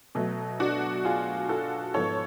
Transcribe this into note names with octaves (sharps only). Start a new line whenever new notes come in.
B2 F#3 A3
D4 F#4
F4 G#4
F#4 A4
G#2 F3 B3 A4 C#5